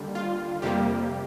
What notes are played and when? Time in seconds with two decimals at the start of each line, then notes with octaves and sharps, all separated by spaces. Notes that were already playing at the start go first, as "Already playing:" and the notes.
Already playing: D#2 D3 G3
0.15 F4
0.62 F2 C3 G3 A#3 G4